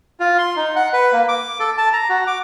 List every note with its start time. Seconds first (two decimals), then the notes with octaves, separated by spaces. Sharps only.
0.20 F4
0.38 C6
0.56 D#4
0.76 F#5
0.93 B4
1.13 A#3
1.28 D6
1.60 A4
1.78 A5
1.93 A#5
2.09 F#4
2.27 D6